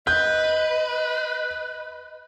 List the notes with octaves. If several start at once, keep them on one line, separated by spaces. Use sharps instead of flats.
B4 D#5 G6